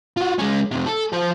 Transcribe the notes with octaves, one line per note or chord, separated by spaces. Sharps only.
F4 F#4
G#3 C#4
F2 C3
A4
F3 C5